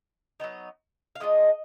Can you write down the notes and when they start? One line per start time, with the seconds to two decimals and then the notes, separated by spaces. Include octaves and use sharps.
0.40 F#3 B3 D#4
1.15 F5
1.20 D3 G#3 D4 F4 D#5